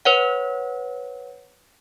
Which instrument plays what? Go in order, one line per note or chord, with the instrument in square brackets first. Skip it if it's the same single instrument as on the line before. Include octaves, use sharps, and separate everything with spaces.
[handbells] B4 C#5 F#5